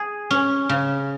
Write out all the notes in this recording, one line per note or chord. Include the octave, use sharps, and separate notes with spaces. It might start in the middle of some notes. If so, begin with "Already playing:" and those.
Already playing: G#4
C#4
C#3